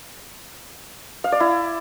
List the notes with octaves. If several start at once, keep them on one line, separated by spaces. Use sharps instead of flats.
F5
D5
E4